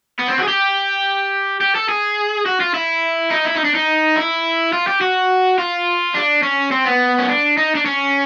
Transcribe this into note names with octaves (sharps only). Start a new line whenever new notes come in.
B3
C4
F#4
G#4
G4
G4
A4
G#4
F#4
F4
E4
D#4
E4
D#4
D4
D#4
E4
F4
G4
F#4
F4
D4
C#4
C4
B3
C#4
D4
D#4
D4
C#4